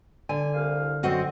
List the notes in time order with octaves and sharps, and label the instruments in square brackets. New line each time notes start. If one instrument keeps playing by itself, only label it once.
[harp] D3 [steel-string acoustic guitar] G#5
[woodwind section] C2 F5
[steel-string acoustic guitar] F#2 F#4 D#5 [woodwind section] C4